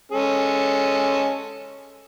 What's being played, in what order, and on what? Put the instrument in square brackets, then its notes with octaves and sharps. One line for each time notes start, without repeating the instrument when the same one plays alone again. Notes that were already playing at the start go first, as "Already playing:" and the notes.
[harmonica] G#3 C#4 A4